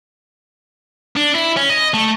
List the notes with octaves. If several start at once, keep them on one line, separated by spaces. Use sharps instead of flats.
D4
E4
C#4
D#5
A3